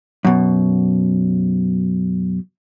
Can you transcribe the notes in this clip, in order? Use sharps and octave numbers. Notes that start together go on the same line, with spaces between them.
F#2 B2